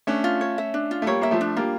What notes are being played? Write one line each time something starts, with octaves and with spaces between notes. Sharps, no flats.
A3 C#4 D4
F4
C#5
E5
D4
F4
A3
G3 A#3 C#5
A#3 E5
F3 A3
D4
G3 A#3 F4